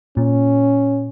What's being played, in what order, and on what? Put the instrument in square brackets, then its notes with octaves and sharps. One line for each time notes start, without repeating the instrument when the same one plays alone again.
[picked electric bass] A#2 [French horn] C#4